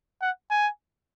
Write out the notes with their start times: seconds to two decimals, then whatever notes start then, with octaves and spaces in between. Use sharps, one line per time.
0.22 F#5
0.51 G#5